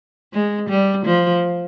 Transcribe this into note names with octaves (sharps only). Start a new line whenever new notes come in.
G#3
G3
F3